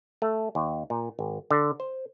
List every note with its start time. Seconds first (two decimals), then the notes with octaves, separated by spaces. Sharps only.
0.22 A3
0.55 D#2
0.90 A#2
1.19 G#1
1.51 D3
1.80 C5